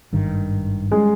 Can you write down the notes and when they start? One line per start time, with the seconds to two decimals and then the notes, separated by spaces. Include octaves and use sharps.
0.13 G#1 G2 D#3
0.91 G3 G#3 C#4 G#4